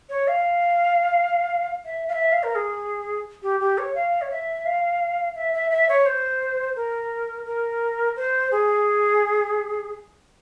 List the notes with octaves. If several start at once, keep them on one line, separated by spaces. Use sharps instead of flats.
C#5
F5
E5
F5
E5
F5
A#4
G#4
G4
G4
C#5
F5
C#5
E5
F5
E5
E5
E5
C#5
C5
A#4
A#4
C5
G#4